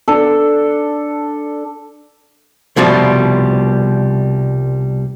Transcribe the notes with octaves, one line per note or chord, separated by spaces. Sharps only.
D4 A4
C2 B2 F3 G3